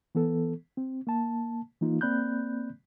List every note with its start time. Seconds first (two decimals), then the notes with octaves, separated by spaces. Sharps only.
0.15 E3 B3 A4
0.77 C4
1.07 A#3 A5
1.81 E3 A#3 D#4 F4
2.01 A#3 C4 D5 B5 F#6 G6